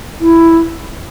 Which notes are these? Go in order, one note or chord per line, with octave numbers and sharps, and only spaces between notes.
E4